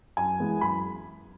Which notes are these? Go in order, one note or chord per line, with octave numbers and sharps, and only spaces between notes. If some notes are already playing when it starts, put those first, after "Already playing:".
F#2 G#5
E3 G#3 B3
F#2 B5